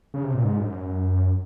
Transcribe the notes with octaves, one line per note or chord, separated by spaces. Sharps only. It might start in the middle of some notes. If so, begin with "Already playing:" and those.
C#3
C3
A#2
G#2
F#2